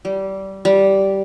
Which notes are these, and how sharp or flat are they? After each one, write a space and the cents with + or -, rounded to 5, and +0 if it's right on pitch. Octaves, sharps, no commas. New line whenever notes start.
G3 -20
G3 -10